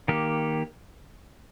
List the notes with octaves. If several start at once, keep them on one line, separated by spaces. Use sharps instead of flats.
D#3 A#3 G4